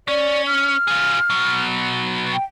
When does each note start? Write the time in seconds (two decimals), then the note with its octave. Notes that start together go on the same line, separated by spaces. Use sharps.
0.08 C#4 D5
0.47 F6
0.88 F4 G#4
1.30 B2 F#3
2.33 G5